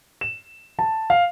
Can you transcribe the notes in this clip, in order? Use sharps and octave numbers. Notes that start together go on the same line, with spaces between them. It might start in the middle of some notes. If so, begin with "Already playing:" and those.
E7
A5
F5